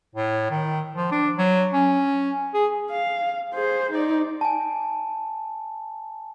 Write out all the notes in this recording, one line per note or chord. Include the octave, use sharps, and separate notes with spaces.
A2
D#3
F3
D4
F#3
C#4
G#4
F5
G#4 C5
D#4 D5
G#5 A5